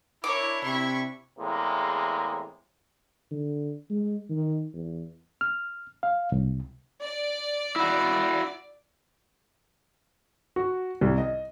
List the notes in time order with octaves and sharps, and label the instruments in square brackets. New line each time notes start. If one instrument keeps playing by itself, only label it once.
[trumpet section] D4 E4 [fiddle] A#4 C#5 [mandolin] D6
[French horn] C3 [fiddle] B5 C#6
[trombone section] E2 A2 C3 G#3 A#3
[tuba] D3
G#3
D#3
E2
[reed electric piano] F6
F5
C2
[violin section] D5
[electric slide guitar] E4 F#4
[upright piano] F#4
C2
D#5